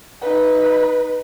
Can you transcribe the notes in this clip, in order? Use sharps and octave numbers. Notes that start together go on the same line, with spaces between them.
D#4 B4